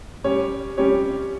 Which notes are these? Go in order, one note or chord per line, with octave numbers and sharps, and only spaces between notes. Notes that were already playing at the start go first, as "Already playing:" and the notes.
G3 C#4 G4 C#5
G3 C#4 G4 C#5